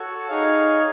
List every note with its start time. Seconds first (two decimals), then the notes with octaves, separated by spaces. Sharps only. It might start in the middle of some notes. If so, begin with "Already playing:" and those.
Already playing: F#4 A4 C#5
0.28 D#4 G#4 C#5 F5